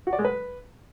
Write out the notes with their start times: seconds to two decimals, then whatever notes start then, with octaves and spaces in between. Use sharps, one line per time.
0.07 F#4
0.13 D5
0.19 G#3
0.25 B4